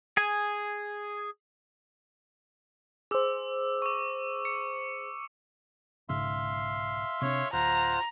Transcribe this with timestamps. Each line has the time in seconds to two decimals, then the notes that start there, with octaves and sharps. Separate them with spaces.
0.17 G#4 G#5
3.11 G#4 C5 D6 E6
3.82 C#6 D6
4.45 C#7
6.09 B1 G#2 C#3 E5 F5 C6
7.21 C3 C#4 D4 C#5
7.53 D1 F4 C5 F#5 A#5